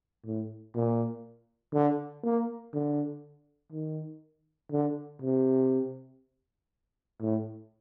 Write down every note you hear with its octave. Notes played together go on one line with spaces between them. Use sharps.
A2
A#2
D3
A#3
D3
D#3
D3
C3
A2